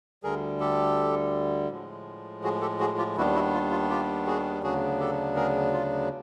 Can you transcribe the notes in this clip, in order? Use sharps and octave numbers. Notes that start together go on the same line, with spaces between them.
D2 D3 G3 G#4 A#4
G4 A4
A2 F3 G#3
F#4 G#4
G4 A4
F#4 G#4
F4 G4
D#2 D#3 G3 B3 D4 E4 F#4
E4 F#4
F4
F4
F4 G4
F#4 G#4
D2 C#3 F#3 B3 D4 F#4 G#4
G4 A4
G#4 A#4
F4